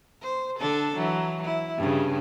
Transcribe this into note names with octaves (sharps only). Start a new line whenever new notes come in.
C5
D3 D4 A4
E3 F#3
E4
G2 C#3